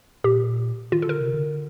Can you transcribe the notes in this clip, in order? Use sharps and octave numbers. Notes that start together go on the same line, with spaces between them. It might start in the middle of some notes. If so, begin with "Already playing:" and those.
A#2 G4
D#3 F4
A4
D3 A#4
C3
D3